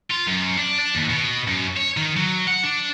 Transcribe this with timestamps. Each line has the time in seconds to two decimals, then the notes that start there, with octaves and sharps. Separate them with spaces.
0.11 F4
0.27 F#2
0.58 D4
0.80 D4
0.95 D#2
1.10 B2
1.47 F#2
1.77 C#5
1.97 D#3
2.17 F#3
2.48 F#5
2.64 D4